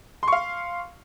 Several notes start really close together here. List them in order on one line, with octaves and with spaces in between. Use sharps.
C6 C#6 F5